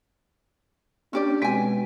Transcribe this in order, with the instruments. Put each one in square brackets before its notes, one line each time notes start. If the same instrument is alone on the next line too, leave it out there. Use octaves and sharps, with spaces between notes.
[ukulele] C#4 G4 D5 [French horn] D4
[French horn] B2 [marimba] G#3 C4 [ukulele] G5 G#5